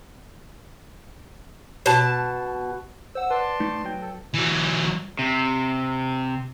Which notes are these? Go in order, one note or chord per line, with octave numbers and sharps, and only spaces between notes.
B2 A5
C5 F#5 E6
B4 D5 A5 C6
A3 D#4
F#3 G5
A4
E3 F#3
C3